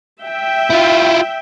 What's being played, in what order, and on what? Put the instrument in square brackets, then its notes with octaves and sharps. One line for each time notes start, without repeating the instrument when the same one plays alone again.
[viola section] E5 G5
[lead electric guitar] E4 F4